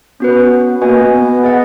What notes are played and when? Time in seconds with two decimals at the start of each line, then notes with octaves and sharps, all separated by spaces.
0.20 B3 C#4 F#4 B4
0.81 A#3 F#4 B4 D#5 G#5
0.97 B3
1.13 B3
1.44 G#4 D#5 F#5